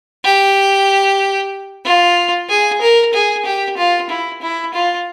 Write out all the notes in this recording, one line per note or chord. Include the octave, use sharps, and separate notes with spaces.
G4
F4
G#4
A#4
G#4
G4
F4
E4
E4
F4